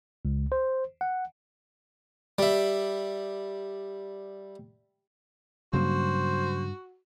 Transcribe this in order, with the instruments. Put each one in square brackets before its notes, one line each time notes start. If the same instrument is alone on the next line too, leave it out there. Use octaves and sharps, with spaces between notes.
[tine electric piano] C#2
C5
F#5
[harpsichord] G3 E5
[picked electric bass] G2 [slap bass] C#3 F#3 A#3 [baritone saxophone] F#4 [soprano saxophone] C5